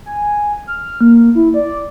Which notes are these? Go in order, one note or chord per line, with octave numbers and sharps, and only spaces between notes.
G#5
F6
A#3
E4
D5